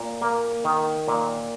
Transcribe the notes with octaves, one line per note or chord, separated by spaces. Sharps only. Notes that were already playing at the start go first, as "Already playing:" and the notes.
Already playing: A#2
A#3
D#3
A#2